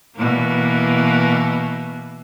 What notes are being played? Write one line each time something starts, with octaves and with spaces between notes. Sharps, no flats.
B2 E3 A#3